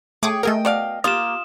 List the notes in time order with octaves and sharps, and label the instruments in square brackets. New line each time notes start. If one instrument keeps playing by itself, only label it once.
[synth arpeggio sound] A3 D6 D#6 [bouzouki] G#4 C#5 G5
[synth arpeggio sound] A3 G#4 A#4 [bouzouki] D#5 F#5 G5
[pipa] B2 D5 F5
[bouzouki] A#3 G4 [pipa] F4 [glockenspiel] D#6 E7